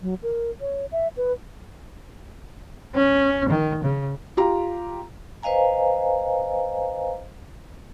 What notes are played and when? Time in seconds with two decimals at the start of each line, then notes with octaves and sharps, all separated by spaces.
0.02 F#3
0.23 A#4
0.61 C#5
0.92 E5
1.17 B4
2.95 C#4
3.49 D#3
3.83 C#3
4.37 F4 G4 A#5
5.43 B4 C5 D#5 F5 G#5 A#5